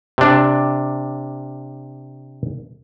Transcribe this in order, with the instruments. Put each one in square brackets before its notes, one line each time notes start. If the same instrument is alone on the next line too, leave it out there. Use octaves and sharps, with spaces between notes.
[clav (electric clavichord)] C3 D4